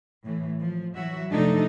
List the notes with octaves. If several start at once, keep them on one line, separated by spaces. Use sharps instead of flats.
A2 E3
F3
E3 F#3 F#4 E5
C3 F3 A3 D4 D#4 A4